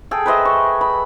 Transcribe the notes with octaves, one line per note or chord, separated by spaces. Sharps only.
G#4 A4 G5
B4 C5 D#5 E5
C#6
B5